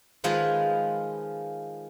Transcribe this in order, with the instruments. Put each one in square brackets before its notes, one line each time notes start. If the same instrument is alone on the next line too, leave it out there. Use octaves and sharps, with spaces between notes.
[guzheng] D#3 F3 G#3 F4 G#4 B4